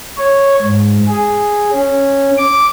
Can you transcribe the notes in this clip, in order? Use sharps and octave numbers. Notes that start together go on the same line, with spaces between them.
C#5
G#2
G#4
C#4
D6